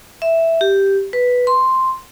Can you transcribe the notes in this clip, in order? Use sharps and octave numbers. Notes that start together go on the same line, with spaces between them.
E5
G4
B4
C6